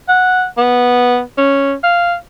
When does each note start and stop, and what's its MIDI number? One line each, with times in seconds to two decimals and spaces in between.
0.08 0.46 78
0.58 1.21 59
1.37 1.74 61
1.83 2.15 77